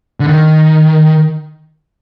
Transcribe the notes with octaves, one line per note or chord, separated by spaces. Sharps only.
D3
D#3